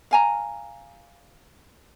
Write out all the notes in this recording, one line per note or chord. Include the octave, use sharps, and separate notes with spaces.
F5 G#5 A#5